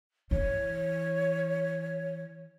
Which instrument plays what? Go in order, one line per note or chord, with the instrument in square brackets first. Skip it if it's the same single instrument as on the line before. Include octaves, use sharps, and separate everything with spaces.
[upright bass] E3 [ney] C#5